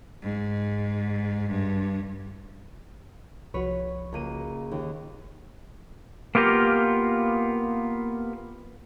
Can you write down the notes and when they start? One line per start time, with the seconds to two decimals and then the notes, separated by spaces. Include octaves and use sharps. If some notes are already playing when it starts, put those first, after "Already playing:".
0.22 G#2
1.50 G2
3.54 C2 F3 F#4 B4 C#5
4.12 C#2 A#3 D#7
4.71 D#2
6.35 A#3 B3 F4 G4 A#4